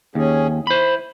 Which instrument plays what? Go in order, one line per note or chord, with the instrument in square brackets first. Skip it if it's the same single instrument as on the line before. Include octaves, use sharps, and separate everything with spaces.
[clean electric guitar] D#2 [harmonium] C#4 G#4
[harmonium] E4 [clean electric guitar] C5 B5